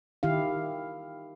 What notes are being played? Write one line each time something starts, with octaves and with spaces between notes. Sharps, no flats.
D#3 E4 G4 F5